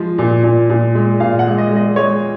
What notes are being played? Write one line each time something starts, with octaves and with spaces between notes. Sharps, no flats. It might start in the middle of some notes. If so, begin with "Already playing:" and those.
Already playing: F3 G#3
A#2
A#2
A#2
G#3
A#2 F5
F#5
G#3
D#5
G#3
D#5
G#3 C#5